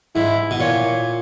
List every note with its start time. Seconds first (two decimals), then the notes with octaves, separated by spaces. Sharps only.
0.16 G#2 E4
0.51 B2
0.60 A#2 C#5